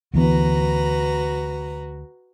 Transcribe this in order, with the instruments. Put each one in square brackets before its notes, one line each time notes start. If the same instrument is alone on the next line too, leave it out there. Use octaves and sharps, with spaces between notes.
[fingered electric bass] D2 E3 B3 [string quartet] F#4 B4 A#5